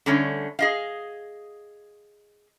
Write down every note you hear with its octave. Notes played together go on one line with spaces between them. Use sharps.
D3 G3 A3 C#4 C#5
G#4 D#5 F5